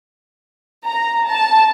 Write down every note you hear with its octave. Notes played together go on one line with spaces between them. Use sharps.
A#5
A5